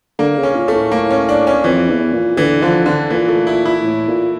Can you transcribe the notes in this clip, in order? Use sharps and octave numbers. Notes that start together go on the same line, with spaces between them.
D3 A#3
C#3
C#4
A#2
A3
A2
A2 A#3
C#4
D4
C#4
F2 E3
E2
A#2
D3 E3
D3 F3
D3
A#2 E3
A3
E4
E4
A2
A#2